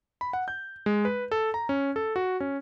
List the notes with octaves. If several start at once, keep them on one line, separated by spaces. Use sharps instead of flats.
B5
F#5
G6
G#3
B4
A4
A#5
C#4
A4
F#4
C#4